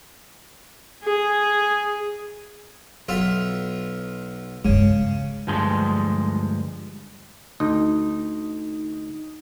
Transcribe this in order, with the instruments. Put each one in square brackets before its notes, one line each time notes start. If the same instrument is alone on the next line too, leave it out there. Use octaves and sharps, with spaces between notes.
[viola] G#4
[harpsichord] B1 F4 E5
[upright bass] E2 G2 [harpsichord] C#3 [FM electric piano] G#3
[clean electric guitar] D2 G2 F3 G#3
[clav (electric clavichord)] D2 [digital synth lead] D#4